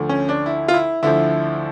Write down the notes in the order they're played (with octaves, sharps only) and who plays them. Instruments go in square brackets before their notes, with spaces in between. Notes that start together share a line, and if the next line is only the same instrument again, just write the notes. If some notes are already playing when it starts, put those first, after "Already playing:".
Already playing: [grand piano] D2 D3 F3
C#4
D4
E4
F4
E4
D2 D3 F3 E4